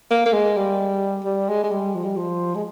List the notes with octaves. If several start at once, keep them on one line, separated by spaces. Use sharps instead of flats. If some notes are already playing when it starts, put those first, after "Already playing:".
A#3
A#3
G#3
G3
G3
G#3
G#3
G3
F3
G3
F3
G#3